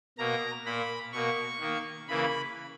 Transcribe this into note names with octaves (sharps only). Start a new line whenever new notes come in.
B2 A#3 A#5
A#2 A#3 B5
B2 A#3 C#6
D#3 A#3
C#3 E3 A#3 B5